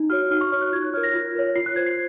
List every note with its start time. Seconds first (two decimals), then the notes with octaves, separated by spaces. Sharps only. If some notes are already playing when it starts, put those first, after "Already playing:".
Already playing: D#4
0.10 F#4 C#5 F6
0.31 D#4 F6
0.41 C#6
0.51 F#4 C#5 F6
0.61 F#6
0.73 F4 G#6
0.82 F#6
0.94 A#4 C#5 F6
1.03 A#6
1.14 F4
1.35 A#4 C#5
1.56 F4 C7
1.66 F#6
1.76 C5 G#6
1.86 C7